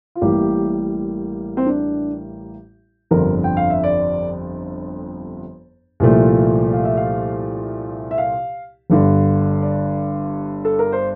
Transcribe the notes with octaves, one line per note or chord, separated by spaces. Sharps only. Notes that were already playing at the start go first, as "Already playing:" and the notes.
F4
A1 A2 G3 A#3 G4
C4
D4
G1 F2 D3 A#4
G5
F5
E5
D5
C2 A#2 F3 A3
F5
E5
F5
E5
F5
G1 G2 D3
D5
A4
A#4
C5